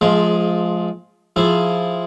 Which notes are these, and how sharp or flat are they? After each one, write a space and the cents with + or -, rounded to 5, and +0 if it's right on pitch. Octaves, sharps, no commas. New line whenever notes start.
F3 +0 G#3 +30 G#4 +0
F3 +0 E4 +0 G#4 +10